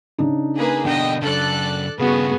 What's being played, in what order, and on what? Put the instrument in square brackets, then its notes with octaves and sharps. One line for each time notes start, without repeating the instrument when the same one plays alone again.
[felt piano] C#3 D4 D#4
[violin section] A#3 G#4 B4
[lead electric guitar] B2 D3 [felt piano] D4 [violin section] D#5 G5
[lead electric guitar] F#2 C#3 [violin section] A4 D5 F#6
[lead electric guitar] G2 C#3 [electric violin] B3 G#4 [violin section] F#4